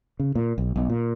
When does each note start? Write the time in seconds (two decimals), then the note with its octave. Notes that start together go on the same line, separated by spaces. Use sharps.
0.20 C#3
0.35 A#2
0.58 B1
0.76 B1
0.90 A#2